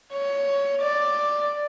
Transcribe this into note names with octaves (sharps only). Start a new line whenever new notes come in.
C#5
D5